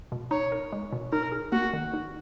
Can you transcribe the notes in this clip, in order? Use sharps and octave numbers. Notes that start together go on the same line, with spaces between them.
B2
D#4 C#5
A#4
G#3
B2
D#4 A#4
G#4
A#3 F#4
D#3
D#4